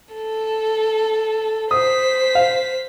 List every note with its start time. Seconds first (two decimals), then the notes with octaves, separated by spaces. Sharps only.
0.14 A4
1.71 C5 D#6 B6
2.35 F5